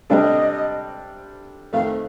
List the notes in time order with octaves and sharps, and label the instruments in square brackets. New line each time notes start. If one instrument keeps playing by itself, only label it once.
[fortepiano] C3 G3 D4 A4 [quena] D#5 F5
[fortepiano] F2 D#3 A3 [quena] F5